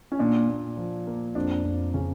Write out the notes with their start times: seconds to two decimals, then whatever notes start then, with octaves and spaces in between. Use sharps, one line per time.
0.12 C#4
0.19 A#2 D4
0.49 A#2
0.77 F3
1.07 A#3
1.35 F2 D4
1.65 F2
1.94 C#3 C#4